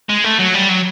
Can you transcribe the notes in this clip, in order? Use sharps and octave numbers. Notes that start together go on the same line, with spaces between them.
G#3
A3
F#3
G3
F#3